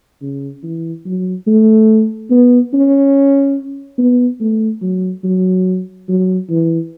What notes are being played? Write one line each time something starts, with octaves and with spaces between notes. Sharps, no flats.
C#3
E3
F#3
A3
B3
C#4
B3
A3
F#3
F#3
F#3
E3